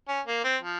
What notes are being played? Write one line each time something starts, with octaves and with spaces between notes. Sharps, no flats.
C#4
A#3
C4
F3